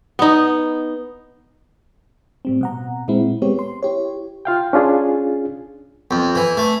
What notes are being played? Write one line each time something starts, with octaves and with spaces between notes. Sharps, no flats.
B3 D#4
A2 G3 C4
B2 F#5 A#5
A#2 G#3 C4 E4
G#3 B3 C4 G4 C#5
C6
E4 G4 C#5
F4 F5 G5
C#4 D4 F4 G#4
F2
E3
A3